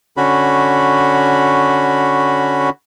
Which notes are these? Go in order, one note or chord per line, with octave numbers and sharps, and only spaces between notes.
D3 C#4 F#4 B5